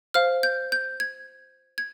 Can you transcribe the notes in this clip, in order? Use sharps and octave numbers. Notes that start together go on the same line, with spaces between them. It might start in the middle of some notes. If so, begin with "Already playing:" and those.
C5 F5 F6
G6
G6
G#6
G#6